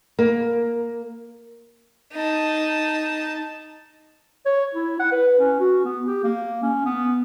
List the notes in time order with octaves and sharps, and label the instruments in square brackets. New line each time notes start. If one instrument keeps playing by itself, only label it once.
[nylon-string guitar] A#3
[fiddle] D#4 A5
[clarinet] C#5
E4
F#5
B4
C#4
F#4
B3
G4
A#3
C#4
B3